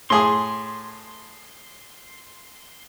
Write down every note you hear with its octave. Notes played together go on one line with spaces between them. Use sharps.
A2 G#4 C6 D#6